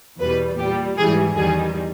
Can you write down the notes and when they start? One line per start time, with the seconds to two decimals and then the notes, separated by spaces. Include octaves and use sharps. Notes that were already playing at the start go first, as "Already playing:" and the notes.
0.20 E2 B2 G3 B4
0.58 A#2 G3 G4
0.97 G#2 E3 G3 G#4
1.36 E2 D#3 G3 G#4